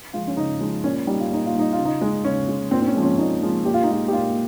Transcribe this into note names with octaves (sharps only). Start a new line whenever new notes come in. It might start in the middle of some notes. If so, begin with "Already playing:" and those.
F3 G#3 F4
C#4
C#3 D#4
F3 G#3
A#2 C#4
G3 D#4
F4
A#2 D#4
F4
G3 D#4
F4
C#3
D#4
G#3
C#3 C#4
G#3
A#2 C4
C4
C#4
F3 G#3
C#4
A#2 D#4
F3 G#3
A#2 G4
F4
D#4
G#3 F4
G4
A#2 F4